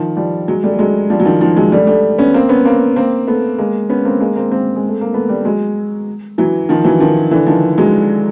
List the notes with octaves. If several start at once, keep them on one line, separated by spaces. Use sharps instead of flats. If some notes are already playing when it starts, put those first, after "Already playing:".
Already playing: D#3 F3
F3 G3
F#3 G#3
G3 A3
A3
F#3 G#3
F3 G3
F#3
D#3 F3
D#3 F3
F#3 G#3
G3 A3
G3 A3
B3 C#4
A#3 C4
B3 C#4
A#3 C4
A#3 C4
A3 B3
G#3 A#3
B3 C#4
A#3 C4
G#3 A#3
A#3 C4
A#3 C4
G#3
A3
A#3
A3 B3
G3 A3
F#3 G#3
E3 F#3
D#3 F3
E3 F#3
D#3 F3
D3 E3
D#3 F3
F#3 G#3